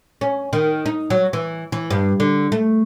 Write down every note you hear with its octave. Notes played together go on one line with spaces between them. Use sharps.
C#4
D#3
D#4
F#3
E3
E3
G2
D3
A3